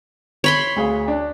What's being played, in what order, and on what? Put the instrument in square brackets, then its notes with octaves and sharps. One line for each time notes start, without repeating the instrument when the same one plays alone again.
[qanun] C#5 B5 C6
[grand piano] D2 G#4 F5
D4